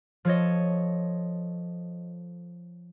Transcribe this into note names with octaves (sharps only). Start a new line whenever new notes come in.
F3 A4 C#5 D#5